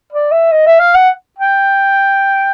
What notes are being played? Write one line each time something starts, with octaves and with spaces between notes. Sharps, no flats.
D5
E5
D#5
E5
F5
F#5
G5